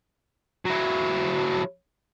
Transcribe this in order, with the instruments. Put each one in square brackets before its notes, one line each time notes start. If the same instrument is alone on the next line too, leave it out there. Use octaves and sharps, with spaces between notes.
[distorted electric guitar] F#3 E4